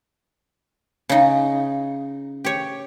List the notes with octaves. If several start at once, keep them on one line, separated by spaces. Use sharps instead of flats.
C#3 D#4
G4 C#5